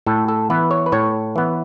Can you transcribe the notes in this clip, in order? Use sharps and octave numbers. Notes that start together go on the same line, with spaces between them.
A2 A4
A4
E3 B3 B4
C#5
B4
A2 C#5
E3 B3